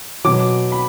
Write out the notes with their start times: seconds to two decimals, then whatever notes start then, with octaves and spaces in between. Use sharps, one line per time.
0.24 B2 F#3 D6
0.72 B5